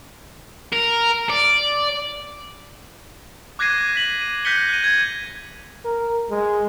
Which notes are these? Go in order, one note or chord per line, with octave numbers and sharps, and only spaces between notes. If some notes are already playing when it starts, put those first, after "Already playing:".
A#4
D5
D6 F#6 G#6 A#6 C7 D#7
B6 F#7
D#7
F#6 G6 A#6 B6 C#7 G7
F#6 D#7
G#6
A#4
G#3